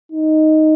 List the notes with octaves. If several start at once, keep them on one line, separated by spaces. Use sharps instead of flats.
D#4